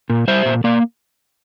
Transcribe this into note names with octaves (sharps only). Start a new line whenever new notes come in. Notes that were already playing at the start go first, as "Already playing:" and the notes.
A#2
G3 C5 E5
A#2
A#3 D5 F5